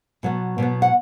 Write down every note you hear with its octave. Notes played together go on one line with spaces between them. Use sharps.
B2 F#3 B3
B2 F#3 B3
F#5